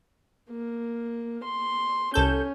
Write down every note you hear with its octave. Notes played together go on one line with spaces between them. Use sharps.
A#3
C6
C2 C#4 A4 G6